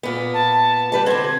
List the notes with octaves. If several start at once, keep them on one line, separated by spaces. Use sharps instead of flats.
A#2 B3
A5
G3 B4 A5
D3 C4 G#6